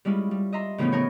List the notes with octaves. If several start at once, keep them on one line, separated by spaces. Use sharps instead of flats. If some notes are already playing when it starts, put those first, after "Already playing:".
G3 G#3 C#4 E4 F4
G3
D#5 E5 A#5 C6
A2 C#3 E3 F3 B3 C#4
B3 D#4 A#4 C#5 G5